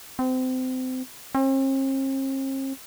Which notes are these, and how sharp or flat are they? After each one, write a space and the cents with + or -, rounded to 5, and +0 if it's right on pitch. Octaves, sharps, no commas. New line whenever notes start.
C4 -30
C4 +45